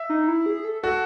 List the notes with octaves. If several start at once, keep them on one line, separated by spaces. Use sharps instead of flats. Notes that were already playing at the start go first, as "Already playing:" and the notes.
Already playing: E5
D#4
E4
G#4
A4
F#4 A4